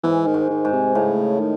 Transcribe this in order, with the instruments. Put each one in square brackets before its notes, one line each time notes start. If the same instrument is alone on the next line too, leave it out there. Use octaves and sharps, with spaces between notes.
[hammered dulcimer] G#2 [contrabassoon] E3
[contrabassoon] D#3
[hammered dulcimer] G#2
[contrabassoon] D#3
[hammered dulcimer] G#2
[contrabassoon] C3
[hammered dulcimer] A2 [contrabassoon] C#3
[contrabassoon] D#3